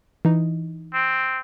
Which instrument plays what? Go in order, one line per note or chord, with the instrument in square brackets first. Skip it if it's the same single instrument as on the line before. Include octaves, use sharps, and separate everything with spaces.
[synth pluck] E3 D#4
[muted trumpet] C4